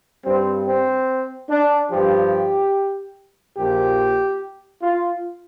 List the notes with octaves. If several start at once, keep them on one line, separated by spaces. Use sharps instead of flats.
G2 G3 C4
C4
D4
G2 F3 G4
A#1 A#2 F3 G4
F4